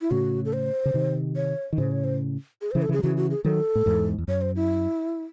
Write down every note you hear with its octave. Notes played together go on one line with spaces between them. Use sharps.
E4
A2 C#3 F#4
A4
C5
C#3
C3 D#3
C#5
D#3
A2 C#3 C5
C#5
C5
G#4
C5
C#3 E3
A4
C#3 E3 G#4
F#3
C#3 E3 F#4
F#4
G#4
D#3 F#3 A4
A2
E2 G#2
E2
F#2 C#5
C5
E4